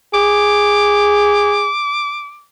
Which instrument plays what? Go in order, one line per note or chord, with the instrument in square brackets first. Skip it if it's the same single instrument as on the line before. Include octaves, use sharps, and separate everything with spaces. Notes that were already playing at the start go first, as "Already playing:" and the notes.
[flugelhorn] G#4 [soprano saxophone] D6